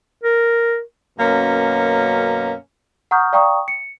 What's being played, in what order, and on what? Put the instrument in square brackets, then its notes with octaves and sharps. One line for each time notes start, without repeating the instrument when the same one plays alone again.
[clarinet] A#4
[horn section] F#2 B2 A#3 C#4
[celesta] F#5 A#5 C#6 D#6 F6 G6
D5 F5 G5 A#5 C#6 D#6
C#7